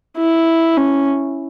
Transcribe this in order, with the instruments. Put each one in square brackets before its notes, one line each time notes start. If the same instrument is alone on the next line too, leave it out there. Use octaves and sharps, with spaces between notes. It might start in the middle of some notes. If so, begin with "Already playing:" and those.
[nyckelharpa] E4
C#4